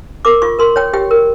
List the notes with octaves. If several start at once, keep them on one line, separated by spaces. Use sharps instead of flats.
A#4 D6
F4 C#6
A#4 C6
C#5 G5
G4 G5
A#4